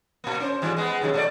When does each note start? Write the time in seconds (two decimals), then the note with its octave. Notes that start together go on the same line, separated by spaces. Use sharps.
0.24 A#2 A#3
0.40 C#4 C5
0.62 G#2 E3 G3
0.77 G#3 B3
1.02 D#2 C3 F#3
1.14 A#2 A3 D5